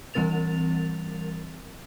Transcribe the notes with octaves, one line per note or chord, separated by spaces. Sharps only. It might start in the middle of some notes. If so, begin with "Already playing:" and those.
E3 G3 C4 A#4 A6 F7